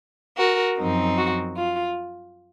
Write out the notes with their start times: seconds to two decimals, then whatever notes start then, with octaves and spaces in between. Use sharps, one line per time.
0.37 F#4 A#4
0.77 F#2 F3 C4 D#4
1.17 F#4
1.57 F4